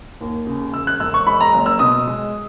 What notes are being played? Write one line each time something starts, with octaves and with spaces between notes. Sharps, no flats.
D#2
C#3
E1 E6
F#6
E1 E6
C#6
G#3 B5
A#5
F#1
E6
B2 D#6
G#3